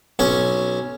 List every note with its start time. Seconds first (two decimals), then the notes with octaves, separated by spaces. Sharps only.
0.19 B1 C#4 C#5